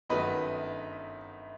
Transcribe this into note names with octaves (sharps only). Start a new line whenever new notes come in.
G1 F#2 D#3 F#3 A3 B4 D#5